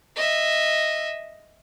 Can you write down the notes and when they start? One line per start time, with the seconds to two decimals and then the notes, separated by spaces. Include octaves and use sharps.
0.16 D#5 E5